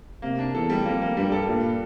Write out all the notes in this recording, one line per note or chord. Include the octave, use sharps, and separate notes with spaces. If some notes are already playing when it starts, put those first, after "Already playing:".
C3 A#3
D4
E2 A4
G3
F2 A#3
A#3
G2 G3
A4
G2 A#2